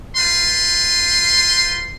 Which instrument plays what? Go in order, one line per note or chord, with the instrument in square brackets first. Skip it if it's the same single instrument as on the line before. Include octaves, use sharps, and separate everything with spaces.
[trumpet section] F4 B4 G5 C6